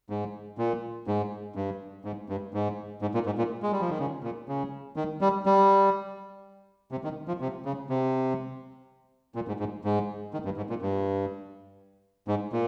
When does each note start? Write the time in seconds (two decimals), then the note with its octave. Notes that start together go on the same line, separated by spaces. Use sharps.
0.10 G#2
0.58 A#2
1.07 G#2
1.56 G2
2.05 G#2
2.29 G2
2.54 G#2
3.02 G#2
3.14 A#2
3.26 G#2
3.38 A#2
3.63 G#3
3.72 G3
3.81 F3
3.90 D#3
3.99 C#3
4.23 A#2
4.49 C#3
4.96 D#3
5.21 G3
5.46 G3
6.92 C3
7.04 D#3
7.28 F3
7.41 C3
7.65 C#3
7.90 C3
9.35 A#2
9.48 G#2
9.60 G#2
9.84 G#2
10.34 D#3
10.45 G2
10.57 G#2
10.70 A#2
10.82 G2
12.28 G#2
12.52 A#2